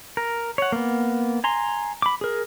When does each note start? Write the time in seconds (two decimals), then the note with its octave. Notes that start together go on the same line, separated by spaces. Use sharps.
0.17 A#4
0.58 C#5 F#5
0.72 A#3 B3
1.44 G#5 A#5 C6
2.02 B5 D6
2.21 G#4 A#4